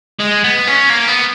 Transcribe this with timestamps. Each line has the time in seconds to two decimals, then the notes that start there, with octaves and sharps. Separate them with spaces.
0.19 G#3
0.44 B3
0.68 C#4
0.90 A#3
1.09 B3